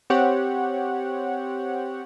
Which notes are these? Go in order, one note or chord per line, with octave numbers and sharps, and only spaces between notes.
C4 G4 C#5 F#5